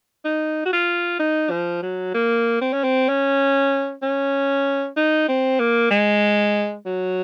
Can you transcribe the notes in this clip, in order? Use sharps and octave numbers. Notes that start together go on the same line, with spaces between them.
D#4
F#4
F4
D#4
F3
F#3
A#3
C4
C#4
C4
C#4
C#4
D#4
C4
A#3
G#3
F#3